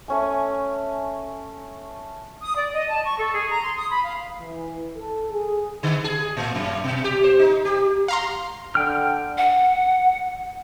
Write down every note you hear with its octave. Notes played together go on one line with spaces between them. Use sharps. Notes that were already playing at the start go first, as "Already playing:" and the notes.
A3 C#4 G#5
D#6
D5
D#5
A5
C#6
A4
G#4
A#5
C6
D#6
B5
F5
E3
A4
G#4
D3
G#4
A2
F#2
B2
G4
C5
D#4
G4
F5 A#5 C6
D3 G5 F6
F#5